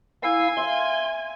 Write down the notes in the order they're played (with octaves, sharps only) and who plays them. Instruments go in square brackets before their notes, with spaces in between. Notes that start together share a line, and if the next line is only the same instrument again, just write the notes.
[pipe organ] E4 F5 E6 [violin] G#5
[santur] E5 F5 [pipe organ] C6